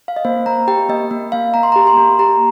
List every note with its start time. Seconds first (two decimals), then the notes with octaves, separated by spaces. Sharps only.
0.08 F5
0.16 D#5
0.25 A#3 C5
0.46 A#3 A#5
0.67 G4 G5
0.89 A#3 D#5
1.11 A#3
1.32 A#3 F5
1.54 A#3 A#5
1.63 C6
1.72 A#5
1.76 G4
1.87 C6
1.97 A#3
2.19 G4 A#5